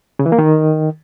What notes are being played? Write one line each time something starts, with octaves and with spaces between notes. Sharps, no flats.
C#3
E3
A#3
D#3